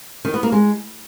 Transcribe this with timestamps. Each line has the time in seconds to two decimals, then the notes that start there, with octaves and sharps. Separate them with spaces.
0.25 D#3
0.34 B3
0.43 A#3
0.52 G#3